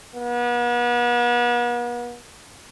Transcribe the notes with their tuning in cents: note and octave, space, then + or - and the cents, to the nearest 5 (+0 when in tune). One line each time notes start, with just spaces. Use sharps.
B3 -40